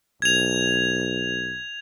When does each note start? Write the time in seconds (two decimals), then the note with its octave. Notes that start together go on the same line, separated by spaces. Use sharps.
0.22 B1 G#6 F7